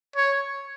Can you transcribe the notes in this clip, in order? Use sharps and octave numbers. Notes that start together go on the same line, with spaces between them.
C#5